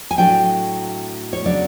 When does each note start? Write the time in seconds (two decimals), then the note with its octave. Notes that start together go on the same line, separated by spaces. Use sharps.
0.11 G#5
0.18 A2 F#3 A3 D4 G5
1.33 C#5
1.45 C#3 F#3 B3 D4 D5